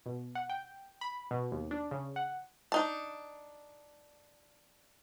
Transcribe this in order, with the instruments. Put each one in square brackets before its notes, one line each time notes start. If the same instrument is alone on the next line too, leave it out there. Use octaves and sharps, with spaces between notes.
[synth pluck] B2
F#5
G5
B5
B2
D#2
D4
C#3
F#5
[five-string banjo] D4 D#4 A5